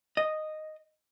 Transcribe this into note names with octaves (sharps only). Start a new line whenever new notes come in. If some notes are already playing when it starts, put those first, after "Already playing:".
D#5